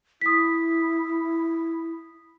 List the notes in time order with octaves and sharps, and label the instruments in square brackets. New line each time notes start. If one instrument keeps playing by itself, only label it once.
[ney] E4 [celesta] D#6 B6